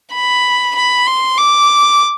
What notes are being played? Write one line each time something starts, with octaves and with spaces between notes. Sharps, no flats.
B5
B5
C6
D6